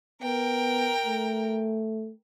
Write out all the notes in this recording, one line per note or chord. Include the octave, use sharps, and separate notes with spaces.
B3 A#4 G5
A3